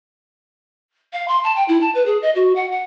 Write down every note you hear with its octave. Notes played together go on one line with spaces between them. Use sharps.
F5
C6
A5
G5
E4
A5
B4
G#4
D#5
F#4
F#5
F#5